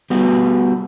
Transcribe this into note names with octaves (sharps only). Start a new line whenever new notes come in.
G3 B3 F#4